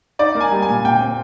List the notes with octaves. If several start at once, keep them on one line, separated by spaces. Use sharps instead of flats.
D#4 D5
A#3
G#5
G3
G#5
A#2
A#2 G5
C4